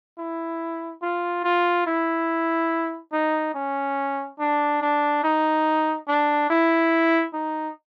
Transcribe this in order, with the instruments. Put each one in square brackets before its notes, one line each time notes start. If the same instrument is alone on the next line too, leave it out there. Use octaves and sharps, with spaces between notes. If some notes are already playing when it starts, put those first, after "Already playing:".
[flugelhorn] E4
F4
F4
E4
D#4
C#4
D4
D4
D#4
D4
E4
D#4